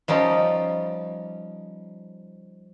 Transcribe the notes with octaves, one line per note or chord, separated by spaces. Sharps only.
F3 G3 C#4 D#4